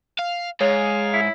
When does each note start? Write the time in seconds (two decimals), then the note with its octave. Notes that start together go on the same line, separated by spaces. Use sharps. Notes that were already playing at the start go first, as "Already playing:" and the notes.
0.19 F5
0.61 G#2 G#4 C#5 F5
1.13 E4